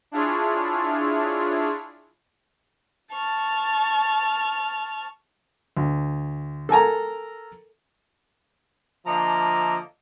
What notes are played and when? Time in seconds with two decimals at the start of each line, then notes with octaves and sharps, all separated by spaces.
0.12 D4 E4 F4 G#4 C#5
3.12 A5 C#6 F6
5.77 D2
6.69 A4 A#4 G#5 A#5
9.06 D3 F3 A#3 D#5 E5 A#5